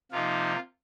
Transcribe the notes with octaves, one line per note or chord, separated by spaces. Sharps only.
C3 F3 A#3 D#4 F4